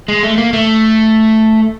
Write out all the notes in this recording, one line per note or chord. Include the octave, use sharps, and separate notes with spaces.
G#3
A3
A#3
A3